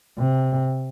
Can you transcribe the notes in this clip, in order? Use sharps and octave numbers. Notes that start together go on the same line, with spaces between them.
C3